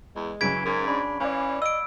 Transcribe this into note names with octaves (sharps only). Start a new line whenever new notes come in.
E2 G#3
C#3 E3 F#3 C#4 G#6 B6 D7
G#2 A#4
D4 B5
E3 C#4 D5 F5
D#5 E6 D7